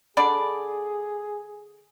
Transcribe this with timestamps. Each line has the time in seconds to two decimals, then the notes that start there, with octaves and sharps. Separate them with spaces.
0.17 D3 D4 G#4 D5 B5